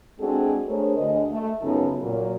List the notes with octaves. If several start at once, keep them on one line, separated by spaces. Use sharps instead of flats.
G#3 C4 D4 F#4 G#4 A4
A3 D4 G#4 A#4 C5 C#5
D2 G#4 D#5
A3
F#2 C#3 B3 D#4 F4 A4
A#2 F#3 A#3